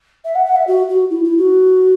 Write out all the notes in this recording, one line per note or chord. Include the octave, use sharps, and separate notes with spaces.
E5
F#5
F#5
E5
F#4
F#4
E4
E4
F#4